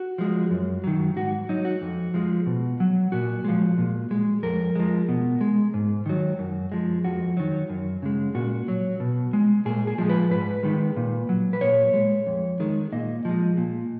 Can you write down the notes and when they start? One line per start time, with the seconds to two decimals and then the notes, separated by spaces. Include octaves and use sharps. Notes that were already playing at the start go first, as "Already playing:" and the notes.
Already playing: F#4
0.18 F3 G#3
0.50 F#2
0.84 D#3 F#3
1.16 G#2 F#4
1.49 F#3 D#4
1.65 F#4
1.82 F2
2.14 F3 G#3
2.46 B2
2.80 F#3
3.12 A#2 F#4
3.45 F3 G#3
3.78 A#2
4.11 G#3
4.43 F2 A#4
4.75 F3 G#3
5.09 B2
5.41 G#3
5.74 G#2
6.06 D#3 F#3
6.39 F#2
6.72 F3 G#3
7.05 F2 F#4
7.37 D#3 F#3
7.70 F#2
8.02 C#3 G#3
8.35 A#2 F#4
8.68 F#3
9.00 B2
9.33 G#3
9.65 A#2 G#4
9.87 G#4
9.98 F3 G#3
10.09 B4
10.31 G#2 B4
10.63 D#3 G#3
10.96 A#2
11.29 F#3
11.53 B4
11.61 A#2 C#5
11.94 G#3
12.27 F2
12.60 D#3 G#3
12.92 A#2 D#5
13.25 F3 G#3
13.57 A#2